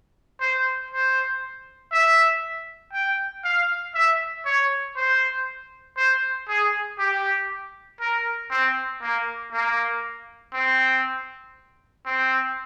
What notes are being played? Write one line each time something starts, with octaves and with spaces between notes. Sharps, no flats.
C5
C5
E5
G5
F5
E5
C#5
C5
C5
G#4
G4
A#4
C4
A#3
A#3
C4
C4